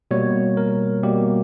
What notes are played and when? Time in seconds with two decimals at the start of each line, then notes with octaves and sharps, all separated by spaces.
0.11 B2 G3 A#3 C#5
0.57 A#4
1.03 B2 G3 A#3 G4